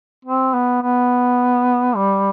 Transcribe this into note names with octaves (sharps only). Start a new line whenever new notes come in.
C4
B3
B3
G3